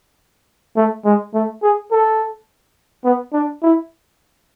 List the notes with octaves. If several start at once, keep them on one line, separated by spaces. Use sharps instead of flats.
A3
G#3
A3
G#4
A4
B3
D4
E4